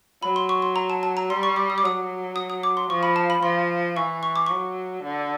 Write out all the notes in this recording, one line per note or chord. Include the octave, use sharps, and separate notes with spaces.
F#3 B5
C6
C#6
C6
A#5
A5
A5
A#5
G3 C6
C#6
D6
D#6
D6
F#3 D#6
D#6
D#6
D6
C6
F3 C#6
B5
A5
B5
F3 C6
E3 C#6
C#6
D6
F#3 C#6
D3